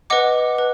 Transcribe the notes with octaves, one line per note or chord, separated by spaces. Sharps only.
B4 D#5 F#5 D6
B4